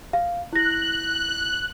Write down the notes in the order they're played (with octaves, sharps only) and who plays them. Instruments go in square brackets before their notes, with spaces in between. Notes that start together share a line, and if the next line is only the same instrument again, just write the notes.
[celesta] F5
[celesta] E4 A#6 [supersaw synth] F#6